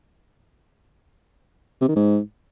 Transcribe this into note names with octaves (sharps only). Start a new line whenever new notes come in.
C3
D#3
G#2